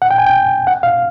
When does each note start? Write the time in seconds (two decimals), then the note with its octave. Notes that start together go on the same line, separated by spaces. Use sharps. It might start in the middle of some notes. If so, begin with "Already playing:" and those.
0.02 F#5
0.11 G5
0.18 G#5
0.26 G5
0.67 F#5
0.83 F5